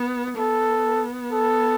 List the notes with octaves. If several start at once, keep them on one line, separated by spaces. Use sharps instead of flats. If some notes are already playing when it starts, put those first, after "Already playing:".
Already playing: B3
B3 A4
A4